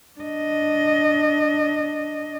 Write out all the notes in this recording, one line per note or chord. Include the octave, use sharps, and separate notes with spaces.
D4 D#5